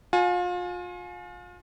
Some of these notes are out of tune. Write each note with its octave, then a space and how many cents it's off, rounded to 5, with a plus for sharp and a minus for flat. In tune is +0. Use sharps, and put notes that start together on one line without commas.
F4 +35 G#5 +25